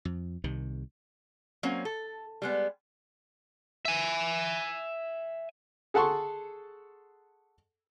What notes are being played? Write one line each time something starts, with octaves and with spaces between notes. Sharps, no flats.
F2
C2 C3 D#3
F#3 A#3 C4 C#4
A4
G3 G#3 B3
E5 G#5
G#4 A4 F#5 A5 C6 C#6